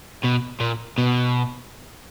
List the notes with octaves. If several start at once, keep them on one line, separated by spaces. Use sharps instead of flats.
B2
A#2
B2